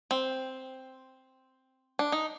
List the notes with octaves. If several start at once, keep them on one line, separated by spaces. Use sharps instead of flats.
C4
D4
D#4